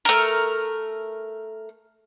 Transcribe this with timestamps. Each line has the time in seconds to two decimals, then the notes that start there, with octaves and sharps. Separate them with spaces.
0.05 A3 A#4